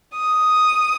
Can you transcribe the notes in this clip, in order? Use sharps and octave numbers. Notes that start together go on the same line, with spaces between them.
D#6